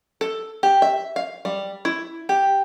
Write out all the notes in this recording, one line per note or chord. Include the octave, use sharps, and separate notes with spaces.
A4
G4
E5
F5
G3
E4
G4